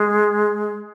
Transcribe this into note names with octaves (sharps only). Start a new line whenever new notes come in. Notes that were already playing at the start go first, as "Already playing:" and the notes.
Already playing: G#3